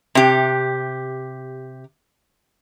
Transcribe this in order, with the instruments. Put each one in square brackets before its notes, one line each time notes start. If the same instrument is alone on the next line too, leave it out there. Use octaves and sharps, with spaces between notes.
[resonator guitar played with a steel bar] C3 G4